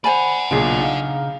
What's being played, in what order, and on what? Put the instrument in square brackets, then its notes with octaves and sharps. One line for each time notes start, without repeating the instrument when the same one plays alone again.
[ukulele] C5 G#5 B5 [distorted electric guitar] D5 F#5
[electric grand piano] B1 A#2 F4 [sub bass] C#3 [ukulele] D4 G#4
[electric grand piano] D#4 F5